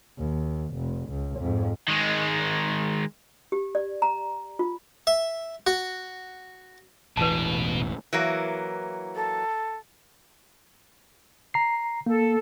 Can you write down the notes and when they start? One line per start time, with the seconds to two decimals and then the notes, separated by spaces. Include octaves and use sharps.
0.18 D#2
0.75 F1
1.09 C#2
1.39 F2 G#2
1.88 D#3 G#3
3.52 G4
3.75 D5
4.02 A#5
4.59 F4
5.07 E5
5.67 F#4
7.17 E1 A1 B2 E3 B4 A5
8.13 E3 F#3 A#3
9.15 A4
11.54 A#5 C7
12.06 A#3 A4